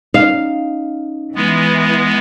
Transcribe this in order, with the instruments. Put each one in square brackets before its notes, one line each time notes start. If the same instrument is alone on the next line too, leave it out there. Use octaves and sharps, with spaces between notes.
[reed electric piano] C#4 D#4 D#5 [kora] F5
[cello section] E3 [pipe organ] G#3 B3